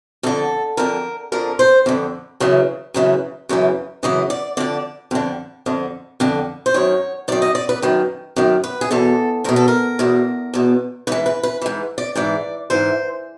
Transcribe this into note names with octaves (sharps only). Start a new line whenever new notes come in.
F2 D3 A4
F2 D3 A#4
F2 D3 A#4
C5
F2 D3
F#2 C#3 E3
F#2 C#3 E3
F#2 C#3 E3
F#2 C#3 E3 D#5
D5
F2 D3 D5
F2 D3
F2 D3
F2 D3
C5
F#2 D#3 C#5
F#2 D#3 D5
D#5
D5
B4
F#2 D#3
F#2 D#3
B4
G#4
E2 B2 A4
E2 B2 A#4
A4
A#4
E2 B2
E2 B2
G#2 E3 B4
B4
B4
G#2 E3
D5
G#2 E3 D5
G#2 E3 C5